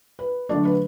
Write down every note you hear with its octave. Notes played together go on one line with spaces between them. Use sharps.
B4
D3 F#3 A3 D4 D5
B4